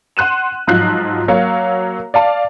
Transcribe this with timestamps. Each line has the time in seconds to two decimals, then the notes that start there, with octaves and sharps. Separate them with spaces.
0.17 F#5 C6 F#6 D#7 E7
0.67 G#2 F3 F#3 F4 F#6 C7
1.28 F#3 A#3 C#5 F5
2.14 D5 F5 A5